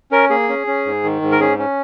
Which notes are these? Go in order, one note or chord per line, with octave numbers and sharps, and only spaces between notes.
C#4 A#4
A#3 G#4
C#4
C#4
G#2
D#3
G#2
A#4
C#4 G#4
C#4